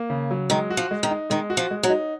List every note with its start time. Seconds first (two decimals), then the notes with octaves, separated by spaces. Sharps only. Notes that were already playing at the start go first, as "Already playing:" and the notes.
Already playing: A#3
0.10 C#3
0.31 F#3
0.50 D#3 G#3
0.70 F#4
0.77 F3
0.91 G#3
1.03 D#3
1.11 D#4
1.30 D#3 G#3
1.50 F#4
1.57 F3
1.71 G#3
1.83 F#3
1.90 D#4